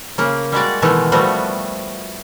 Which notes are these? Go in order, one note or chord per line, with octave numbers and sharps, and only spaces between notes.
C#3 A#3
G3 G#3 F#4 D5
B2 D#3 E3 G#3 A3
F3 G3 A3 B3 C4 F#4